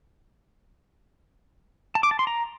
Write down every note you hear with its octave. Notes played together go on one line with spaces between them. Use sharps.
A5
D6
A5
C6
A#5